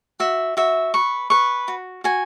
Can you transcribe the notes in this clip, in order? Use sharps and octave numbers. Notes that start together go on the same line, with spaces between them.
F#4 E5
F#4 E5
B4 C#6
B4 C#6
F#4
F#4 G#5